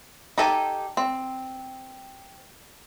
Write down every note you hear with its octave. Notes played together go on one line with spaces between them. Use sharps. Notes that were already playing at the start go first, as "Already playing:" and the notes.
D#4 G4 A4 G#5
C4